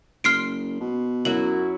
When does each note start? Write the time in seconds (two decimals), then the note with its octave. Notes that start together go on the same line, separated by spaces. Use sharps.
0.24 F#1 C6 F6 C7 D7
0.80 B2
1.25 F#2 F#3 E4 F#4 F#7